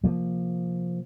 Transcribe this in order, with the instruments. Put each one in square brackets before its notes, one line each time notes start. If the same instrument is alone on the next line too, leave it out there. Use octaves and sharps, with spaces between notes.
[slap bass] C3 F3 A#3